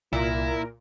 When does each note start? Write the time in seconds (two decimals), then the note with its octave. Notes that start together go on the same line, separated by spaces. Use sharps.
0.13 C2 A#2 E4 A#4